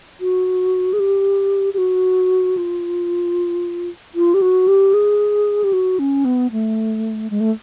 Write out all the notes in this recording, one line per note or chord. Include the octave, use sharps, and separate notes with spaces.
F#4
G#4
G4
G4
F#4
F4
F4
G4
F#4
G4
G#4
G4
F#4
C#4
B3
A3
G#3
A3